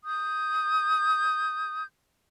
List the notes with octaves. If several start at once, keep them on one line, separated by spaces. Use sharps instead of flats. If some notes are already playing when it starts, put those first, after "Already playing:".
D#6 G6